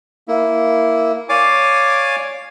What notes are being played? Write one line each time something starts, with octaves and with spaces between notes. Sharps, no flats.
A#3 E4
C#5 D5 F5 G#5 D6